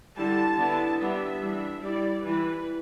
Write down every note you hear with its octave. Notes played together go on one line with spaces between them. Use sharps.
D3 G3 E4 A5
D3 B3 E4
D3 G3 B3 D4 E5
E3 G3 D4
G3 E4 D5
E3 G3 E4 B4